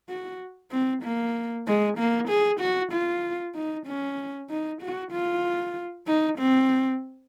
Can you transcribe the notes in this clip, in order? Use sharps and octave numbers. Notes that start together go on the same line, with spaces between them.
F#4
C4
A#3
G#3
A#3
G#4
F#4
F4
D#4
C#4
D#4
F#4
F4
D#4
C4